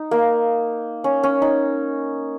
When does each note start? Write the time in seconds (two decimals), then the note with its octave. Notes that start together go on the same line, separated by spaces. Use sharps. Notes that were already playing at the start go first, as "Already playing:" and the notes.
Already playing: D#4
0.11 A#3
1.04 C#4
1.23 C#4
1.42 D#4